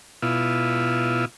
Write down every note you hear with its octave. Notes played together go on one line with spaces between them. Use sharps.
B2 E4 F4